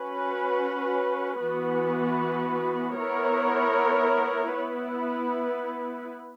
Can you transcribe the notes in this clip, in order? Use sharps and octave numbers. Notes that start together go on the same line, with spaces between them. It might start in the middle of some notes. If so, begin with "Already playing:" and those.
Already playing: C#4 F#4 B4
E3 B3 F#4 B4
B3 E4 A#4 C#5
B3 E4 B4